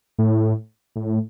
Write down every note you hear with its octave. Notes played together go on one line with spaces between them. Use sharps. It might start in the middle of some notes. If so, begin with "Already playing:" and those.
A2
A2